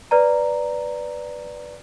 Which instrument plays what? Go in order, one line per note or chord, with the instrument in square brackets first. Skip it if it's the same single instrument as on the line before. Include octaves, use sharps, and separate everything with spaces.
[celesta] B4 D5 A#5